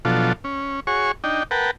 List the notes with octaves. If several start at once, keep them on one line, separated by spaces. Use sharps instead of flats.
B2 F3 F#3 D4 F4 A4
C#4
F#4 G#4 C#5 C#6
D4 D#4 G5
A#4 B4 F#5 G5 A5